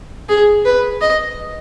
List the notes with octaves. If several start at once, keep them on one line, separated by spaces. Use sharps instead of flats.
G#4
B4
D#5